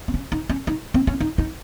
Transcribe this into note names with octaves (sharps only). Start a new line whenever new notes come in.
C4
C#4
D#4
C#4
D#4
C4
C#4
D#4
D#4